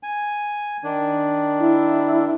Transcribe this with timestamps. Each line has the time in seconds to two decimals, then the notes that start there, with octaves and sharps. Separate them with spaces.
0.03 G#5
0.84 D#3 D4
1.59 E4